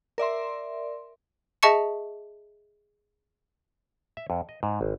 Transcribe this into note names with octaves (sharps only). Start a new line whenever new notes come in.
A#4 D5 E5 C6
G#4 D#5 E5 A5 C#6 C#7
E5
F2
D#5
G#2
G#1